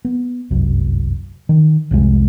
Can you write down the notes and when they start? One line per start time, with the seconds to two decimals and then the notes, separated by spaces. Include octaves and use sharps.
0.05 B3
0.50 G1 C2 F#2
1.49 D#3
1.91 C2 F2 C3 G#3